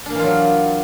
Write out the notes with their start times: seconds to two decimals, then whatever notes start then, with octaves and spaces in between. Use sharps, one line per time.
0.06 D4
0.10 A#3
0.15 E3
0.19 F4
0.24 F#3